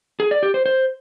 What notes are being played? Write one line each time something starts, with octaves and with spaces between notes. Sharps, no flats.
G#4
D5
G4
C5
C5